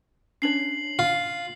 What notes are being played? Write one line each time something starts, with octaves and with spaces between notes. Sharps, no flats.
C#4 D4 C#5 C7 F#7
F4 C7